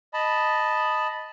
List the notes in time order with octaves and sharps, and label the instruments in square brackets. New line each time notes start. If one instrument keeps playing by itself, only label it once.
[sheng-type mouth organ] D#5 A5 B5